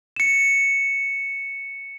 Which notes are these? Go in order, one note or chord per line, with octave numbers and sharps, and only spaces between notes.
C#7 E7